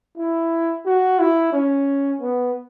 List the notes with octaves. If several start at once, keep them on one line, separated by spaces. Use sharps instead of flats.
E4
F#4
E4
C#4
B3